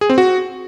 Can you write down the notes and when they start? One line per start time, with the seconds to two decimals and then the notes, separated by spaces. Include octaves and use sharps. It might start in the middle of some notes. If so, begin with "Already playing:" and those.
0.01 G#4
0.10 C4
0.18 F#4